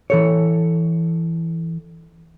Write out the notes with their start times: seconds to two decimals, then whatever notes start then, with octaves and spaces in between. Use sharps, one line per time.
0.10 E3 A4 C#5